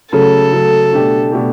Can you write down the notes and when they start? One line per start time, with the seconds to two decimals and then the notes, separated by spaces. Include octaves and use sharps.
0.12 C#3 F#3 A3 A4
0.53 C#3 F#3 A3
0.93 B2 A3 D4 G4
1.32 B2 A3 D4 G4